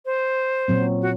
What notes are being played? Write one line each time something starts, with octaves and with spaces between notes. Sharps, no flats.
C5
A#2 F#3 C4
F#4